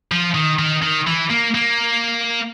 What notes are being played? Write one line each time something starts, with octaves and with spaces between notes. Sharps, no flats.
F3
D#3
D#3
D#3
E3
A#3
A#3